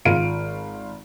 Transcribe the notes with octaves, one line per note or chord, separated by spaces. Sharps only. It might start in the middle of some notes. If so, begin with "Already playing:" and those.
G#1 F4 F5 D7 D#7